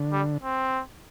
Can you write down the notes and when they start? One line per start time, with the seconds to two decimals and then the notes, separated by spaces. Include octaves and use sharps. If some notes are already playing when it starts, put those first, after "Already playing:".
Already playing: D3
0.12 G3
0.44 C4